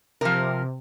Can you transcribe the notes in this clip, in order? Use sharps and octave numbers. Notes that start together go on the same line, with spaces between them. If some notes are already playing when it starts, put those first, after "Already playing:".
C3 F3 A#4